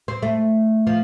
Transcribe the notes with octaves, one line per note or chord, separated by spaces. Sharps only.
C4
A3
F3